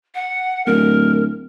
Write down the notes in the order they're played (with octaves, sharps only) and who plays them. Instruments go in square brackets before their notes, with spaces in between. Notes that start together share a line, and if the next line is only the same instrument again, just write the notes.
[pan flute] F#5
[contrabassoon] D1 [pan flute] A#4